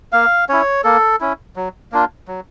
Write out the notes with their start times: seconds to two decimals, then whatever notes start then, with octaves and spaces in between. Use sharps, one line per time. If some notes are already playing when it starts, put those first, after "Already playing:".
0.12 A#3 F5
0.49 C#4 E4 C#5
0.84 A#3 A4
1.21 C#4 E4
1.56 F#3
1.92 A#3 D4 F4
2.28 F#3